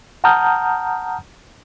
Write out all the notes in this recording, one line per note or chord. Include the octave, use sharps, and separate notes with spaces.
F#5 A5 A#5 D#6 F6 G6